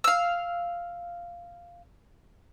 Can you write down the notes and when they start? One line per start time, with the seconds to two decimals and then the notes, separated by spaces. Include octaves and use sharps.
0.04 F5 E6